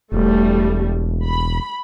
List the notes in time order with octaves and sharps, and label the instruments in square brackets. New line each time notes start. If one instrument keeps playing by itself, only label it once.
[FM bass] E1 [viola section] G3 A3
[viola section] B5